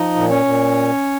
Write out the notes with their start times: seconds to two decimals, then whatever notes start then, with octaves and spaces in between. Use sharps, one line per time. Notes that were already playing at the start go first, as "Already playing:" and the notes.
Already playing: F3 D#4 D#5
0.15 A#2
0.30 C#4 C#5
0.45 A#2